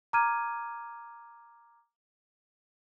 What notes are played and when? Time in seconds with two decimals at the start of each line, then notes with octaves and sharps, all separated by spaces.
0.13 A#5 D6 F6 G#6 D#7